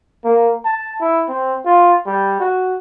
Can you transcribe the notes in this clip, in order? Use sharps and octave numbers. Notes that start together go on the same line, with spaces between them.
A#3
A5
E4
C4
F4
G3
F#4